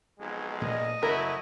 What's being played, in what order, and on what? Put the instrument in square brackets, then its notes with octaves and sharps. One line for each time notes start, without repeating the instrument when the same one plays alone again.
[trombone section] B1 F2 G#3
[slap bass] A#2 A3 [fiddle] D#5
[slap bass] F#1 [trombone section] F#3 A3 E4 [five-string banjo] A#4